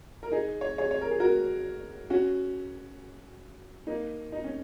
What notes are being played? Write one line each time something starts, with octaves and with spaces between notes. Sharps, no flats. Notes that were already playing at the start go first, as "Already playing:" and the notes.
A#4
D#4 G#4
C#5
G#4 C#5
C#5
A#4
G#4
F#4 A#4
C#4 F#4
A#3 D#4
D#4
C#4